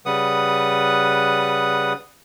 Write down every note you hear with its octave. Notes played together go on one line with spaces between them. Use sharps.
C#3 G3 B4 F#5 D#6